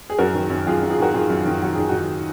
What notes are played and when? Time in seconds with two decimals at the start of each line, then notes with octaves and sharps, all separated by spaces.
0.10 G#4
0.19 F#2 F#4 A#4
0.34 D#3
0.50 F#2
0.67 F#2 F4 G#4
0.82 F#2
0.90 F4 G#4
0.98 D#3 F#4 A#4
1.14 D#3 F4 G#4
1.30 F#2
1.46 D#3
1.61 F#2 F#4
1.75 D#3 G#4
1.89 D#3 D#4 F#4